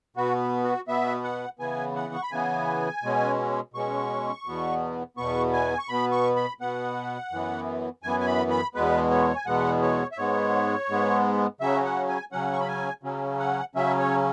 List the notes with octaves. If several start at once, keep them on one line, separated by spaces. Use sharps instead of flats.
B2 B3 F#4
F#4
B2 B3 E5
F#5
C#3 E3 B3 G#5
F#5
C#6
B5
C#3 E3 B3 G#5
B2 G#3 C#4
B2 G#3 C#4 C#6
E2 B2 B3
E2 B2 B3 C#6
G#5
C#6
B2 B3 B5
C#6
B5
B2 B3 F#5
F#2 E3 B3
F#2 E3 B3 G#5
G#5
B5
B5
E2 B2 G#3 B3 B4
C#5
G#5
E2 B2 G#3 B3 F#5
C#5
E5
G#2 G#3 B3 C#5
G#2 G#3 B3
C#3 F#3 C#4 E5
F#5
G#5
C#3 F#3 C#4 F#5
C#6
B5
G#5
C#3 F#3 C#4
F#5
C#3 F#3 C#4 E5
C#5